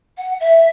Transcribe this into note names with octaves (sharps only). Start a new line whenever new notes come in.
F#5
E5